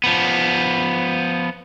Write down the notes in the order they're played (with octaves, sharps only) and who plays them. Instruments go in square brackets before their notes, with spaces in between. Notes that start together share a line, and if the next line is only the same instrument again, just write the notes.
[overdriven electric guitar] F3 B3